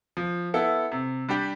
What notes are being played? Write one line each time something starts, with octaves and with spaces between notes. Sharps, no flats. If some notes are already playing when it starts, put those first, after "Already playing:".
F3
B3 E4 A4
C3
G3 D4 G4